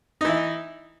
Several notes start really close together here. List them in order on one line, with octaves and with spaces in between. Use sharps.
D#4 E3 E4